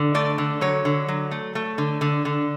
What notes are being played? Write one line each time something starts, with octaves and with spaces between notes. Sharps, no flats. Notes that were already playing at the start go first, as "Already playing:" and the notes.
Already playing: D3
A3 D5
D3
F#3 C#5
D3
F#3
A3
A3
D3
D3
D3